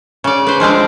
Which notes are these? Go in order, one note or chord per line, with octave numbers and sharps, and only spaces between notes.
C#3 D5
B4 C5
F3 G#3 C4 D4